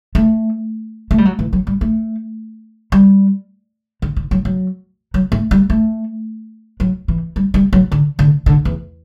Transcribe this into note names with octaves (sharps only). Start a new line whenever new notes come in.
A3
A3
G3
F#3
E3
F#3
G3
A3
G3
D3
D3
F#3
F#3
F#3
A3
G3
A3
F#3
E3
G3
G3
F#3
D3
D3
D3
E2